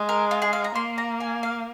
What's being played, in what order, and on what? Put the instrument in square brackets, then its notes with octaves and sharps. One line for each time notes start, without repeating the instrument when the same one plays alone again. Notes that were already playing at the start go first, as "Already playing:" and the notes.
Already playing: [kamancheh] G#3
[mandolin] A#4
F4
G#4
F5
A#5
[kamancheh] A#3 [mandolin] C6
[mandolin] A#5
G#5
F5